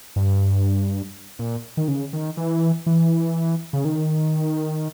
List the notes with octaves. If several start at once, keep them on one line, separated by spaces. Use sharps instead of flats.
G2
A#2
D#3
C#3
D#3
E3
E3
C#3
D#3